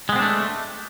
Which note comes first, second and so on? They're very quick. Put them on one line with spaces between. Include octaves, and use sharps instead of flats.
G#3 B3 C4 D4 A3